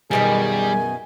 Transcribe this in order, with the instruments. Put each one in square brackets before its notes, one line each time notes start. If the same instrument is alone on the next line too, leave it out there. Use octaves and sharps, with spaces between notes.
[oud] F#2 B2 D#3 [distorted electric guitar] G3 [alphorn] G#4 [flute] G#5